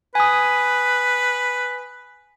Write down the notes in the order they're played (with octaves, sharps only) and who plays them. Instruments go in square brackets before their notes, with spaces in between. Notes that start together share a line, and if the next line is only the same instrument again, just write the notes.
[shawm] B4 [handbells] G#5 D#6